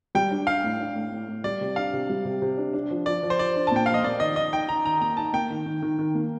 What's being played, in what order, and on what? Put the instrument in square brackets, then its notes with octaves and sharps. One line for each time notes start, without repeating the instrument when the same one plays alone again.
[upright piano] G3 [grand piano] G5
[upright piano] D4
[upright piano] D4 [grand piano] F5
[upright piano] A2
D4
A2
A2
A2
[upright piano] G3 [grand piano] D5
[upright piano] C3
[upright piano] D4 [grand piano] F5
[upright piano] C3
G3
C3
C3
D4
D4
F3
[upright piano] F3 [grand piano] D5
[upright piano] F3
[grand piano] C5
[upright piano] F3 [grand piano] D5
[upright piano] D4
[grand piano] A5
[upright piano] A#2 [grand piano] G5
[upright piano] F3 [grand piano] F5
[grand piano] D#5
[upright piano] A#3 [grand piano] D5
[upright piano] D#3 [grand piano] D#5
[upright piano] D#3 [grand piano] D#5
[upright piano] D#4 [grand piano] G5
[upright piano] D#4 [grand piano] A#5
[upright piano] D#3 [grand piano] A#5
[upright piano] A#3 [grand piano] A#5
[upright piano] D#4 [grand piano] A5
[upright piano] A#3 [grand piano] G5
[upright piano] D#3
D#3
D#3
D#3
A#3